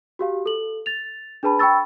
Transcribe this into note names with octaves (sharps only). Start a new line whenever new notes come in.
F#4 G4 F5
A4 F#7
A6 F7
D4 G#4 B4 A5 B5
G5 B5 C#6 E6 A6